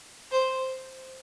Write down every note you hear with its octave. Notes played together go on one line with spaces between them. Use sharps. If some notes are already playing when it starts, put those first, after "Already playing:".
C5